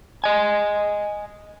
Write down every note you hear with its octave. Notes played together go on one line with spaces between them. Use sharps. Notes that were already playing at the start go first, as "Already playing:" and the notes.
D#5 G#5